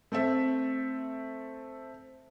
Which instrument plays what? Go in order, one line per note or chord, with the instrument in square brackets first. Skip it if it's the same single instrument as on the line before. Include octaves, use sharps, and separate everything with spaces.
[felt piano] A3 C4 A4 E5